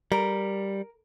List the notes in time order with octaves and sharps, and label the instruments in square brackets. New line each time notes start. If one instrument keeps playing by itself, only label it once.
[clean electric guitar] G3 [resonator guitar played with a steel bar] A#4